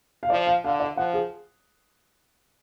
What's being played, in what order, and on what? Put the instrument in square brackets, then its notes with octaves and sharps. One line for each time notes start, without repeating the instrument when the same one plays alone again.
[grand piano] F5
[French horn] F3 [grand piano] D5
[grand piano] F5
[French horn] D3 [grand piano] F5
[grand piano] D5
[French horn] F3 [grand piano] F#5
[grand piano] G#4